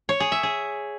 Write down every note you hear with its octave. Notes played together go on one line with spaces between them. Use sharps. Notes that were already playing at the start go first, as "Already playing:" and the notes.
C#5
G#4
E5
G#4